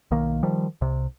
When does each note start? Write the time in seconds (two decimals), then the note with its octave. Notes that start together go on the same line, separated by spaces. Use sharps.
0.11 B1 D#3 A#3
0.43 D#3 F3 G3
0.81 C2 C3